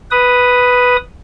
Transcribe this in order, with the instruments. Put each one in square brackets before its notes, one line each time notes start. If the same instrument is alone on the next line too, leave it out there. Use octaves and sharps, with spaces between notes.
[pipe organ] B4 D#6